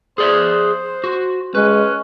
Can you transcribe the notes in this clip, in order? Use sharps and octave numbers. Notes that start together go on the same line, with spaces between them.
G#4 C5 D5 E5
F#4
G#3 C#4 B4